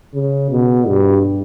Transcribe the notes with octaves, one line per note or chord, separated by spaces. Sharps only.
C#3
B2
G2